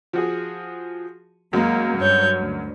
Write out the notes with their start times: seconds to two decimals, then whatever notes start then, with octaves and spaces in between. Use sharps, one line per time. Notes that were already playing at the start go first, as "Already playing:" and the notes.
0.13 F3 F#4 G#4
1.53 F#2 G#3 A#3
1.98 G2 C#5 G6
2.40 D2